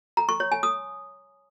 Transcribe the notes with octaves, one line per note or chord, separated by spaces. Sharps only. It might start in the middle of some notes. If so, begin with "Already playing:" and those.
A#5
C#6
C#5
G#5
D#6